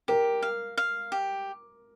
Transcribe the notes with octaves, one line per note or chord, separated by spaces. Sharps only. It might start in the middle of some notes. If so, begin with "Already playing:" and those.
G4 A#4
F5
F5
G4